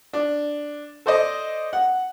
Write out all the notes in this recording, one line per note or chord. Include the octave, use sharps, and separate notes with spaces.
D4
A4 C5 D5 D#5
F#5